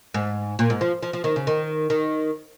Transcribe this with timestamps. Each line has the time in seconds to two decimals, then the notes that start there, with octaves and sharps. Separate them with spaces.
0.14 G#2
0.59 A#2
0.70 G#2
0.81 F3
1.03 F3
1.13 F3
1.24 D#3
1.36 C#3
1.47 D#3
1.90 D#3